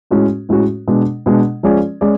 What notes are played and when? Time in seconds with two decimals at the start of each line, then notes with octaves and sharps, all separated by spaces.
0.11 A2 G#3 C#4 F#4
0.49 A2 G#3 C#4 F#4
0.88 B2 G#3 D4
1.26 B2 G#3 D4
1.63 F3 G#3 C#4 G#4 D5
2.01 G#3 C#4 G#4 D5